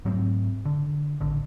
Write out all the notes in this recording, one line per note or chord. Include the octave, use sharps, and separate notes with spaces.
G#2 F#3 A3 C4
D3
A1 D3